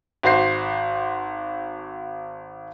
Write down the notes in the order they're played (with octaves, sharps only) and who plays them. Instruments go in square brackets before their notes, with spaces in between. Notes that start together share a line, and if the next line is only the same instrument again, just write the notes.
[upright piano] G#1 F#4 C5 C7